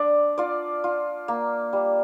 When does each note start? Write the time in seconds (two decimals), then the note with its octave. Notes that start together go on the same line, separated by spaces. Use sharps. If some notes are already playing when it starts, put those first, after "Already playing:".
Already playing: D4 D5
0.38 F4 D5
0.84 F4
1.28 A#3
1.73 G3